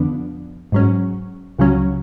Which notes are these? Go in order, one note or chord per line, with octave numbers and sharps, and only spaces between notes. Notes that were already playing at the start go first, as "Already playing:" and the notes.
Already playing: F2 D3 F3 B3 D4
G#2 F#3 C#4
C#2 C#3 F#3 C#4